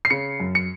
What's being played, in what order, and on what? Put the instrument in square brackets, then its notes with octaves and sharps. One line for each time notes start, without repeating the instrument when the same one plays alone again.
[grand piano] C7
C#3 C#7
F#2
C#7